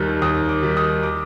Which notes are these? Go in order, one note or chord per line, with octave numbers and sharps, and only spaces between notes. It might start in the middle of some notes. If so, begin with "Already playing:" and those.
Already playing: D#2 D#3 G3
D#2 D#6
D6
D#3 G3
D#6
D6